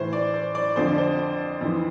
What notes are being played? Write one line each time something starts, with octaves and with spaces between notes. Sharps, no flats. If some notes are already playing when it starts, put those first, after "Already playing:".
Already playing: A2 E3 C5
D5
C5
D5
F2 D3 F3 C5
D5
C5
F2 E3